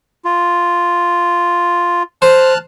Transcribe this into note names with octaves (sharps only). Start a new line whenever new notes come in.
F4
C5 A5 F6 F#6